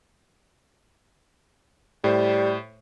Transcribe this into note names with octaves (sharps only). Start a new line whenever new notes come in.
A2 G3 C5